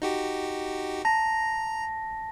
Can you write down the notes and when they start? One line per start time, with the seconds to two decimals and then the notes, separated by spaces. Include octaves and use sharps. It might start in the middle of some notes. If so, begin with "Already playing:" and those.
0.02 D#4 F#4 G4
1.05 A5 A#5 A#6